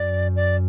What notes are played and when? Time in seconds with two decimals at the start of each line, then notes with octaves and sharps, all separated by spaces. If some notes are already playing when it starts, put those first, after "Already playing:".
Already playing: F#2 D5
0.36 D5